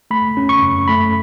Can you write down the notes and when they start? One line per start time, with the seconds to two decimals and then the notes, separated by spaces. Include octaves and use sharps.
0.11 A3 B5
0.37 C#4
0.49 C#6
0.62 F#2
0.88 A3 B5